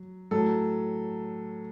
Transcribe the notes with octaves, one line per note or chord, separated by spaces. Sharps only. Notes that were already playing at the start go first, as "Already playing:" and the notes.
Already playing: F#3
A2 F#3 A4